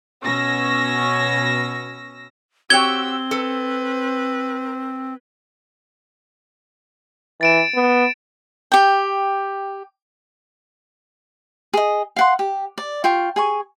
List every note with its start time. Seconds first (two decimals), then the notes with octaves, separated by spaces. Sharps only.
0.24 B2 C#4 E6 A#6
2.70 C4 F#4 G4 C#5 G5 E6 G#6 G7
3.31 A4 B4
7.41 E3 A6 D7 E7
7.74 B3
8.72 G4 G5
11.74 G#4 D#5
12.16 F5 F#5 C6
12.39 G4
12.78 D5
13.04 F4 G5 C#6
13.36 G#4 G#5 C#6